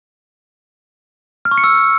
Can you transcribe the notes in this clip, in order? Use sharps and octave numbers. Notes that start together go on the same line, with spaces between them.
F6
C#6
C#7
E6